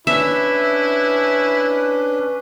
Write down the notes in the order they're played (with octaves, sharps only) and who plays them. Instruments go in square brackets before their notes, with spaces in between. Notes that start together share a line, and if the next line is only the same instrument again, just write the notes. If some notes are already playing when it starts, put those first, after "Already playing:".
[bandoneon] C#4 D4 [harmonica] E4 [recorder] B4 [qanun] E5